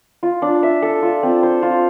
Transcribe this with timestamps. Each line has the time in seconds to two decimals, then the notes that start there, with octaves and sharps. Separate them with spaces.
0.23 F4
0.42 D4
0.63 E5
0.82 A4
1.02 F4
1.23 C4
1.43 C5
1.62 F4